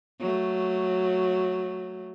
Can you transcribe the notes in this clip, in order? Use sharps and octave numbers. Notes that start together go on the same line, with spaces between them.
F#3 A3